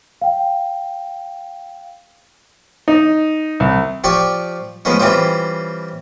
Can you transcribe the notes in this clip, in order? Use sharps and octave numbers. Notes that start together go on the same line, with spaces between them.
F5 G5
D#4
C2
F3 G4 D5 G5 C#6
F3 G#3 B3 C#4 D#4
E3 G3 C4 C#4 F4 C5